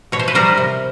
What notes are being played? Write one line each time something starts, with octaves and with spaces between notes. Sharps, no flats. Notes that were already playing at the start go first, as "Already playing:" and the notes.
B2 C#5
C5
B4
G3 A#4 C5
C3